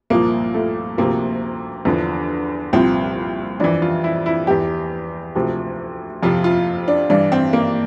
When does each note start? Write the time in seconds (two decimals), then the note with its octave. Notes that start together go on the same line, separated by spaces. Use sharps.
0.10 C2 A#2 F3 A#3
0.54 A3
0.98 D2 C3 F3 A#3
1.85 E2 D3 F3
2.73 C2 A#2 F3 C4
3.60 F2 E3 D4
3.82 F4
4.04 E4
4.26 E4
4.47 E2 E3 G4
5.35 D2 C3 F3
6.23 F2 C3 F3 F4
6.44 F4
6.88 D4
7.10 G2 E3 D4
7.32 C4
7.53 A#3